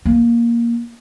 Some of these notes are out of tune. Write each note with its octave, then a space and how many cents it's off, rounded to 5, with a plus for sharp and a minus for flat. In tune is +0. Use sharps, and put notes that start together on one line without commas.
A#3 +10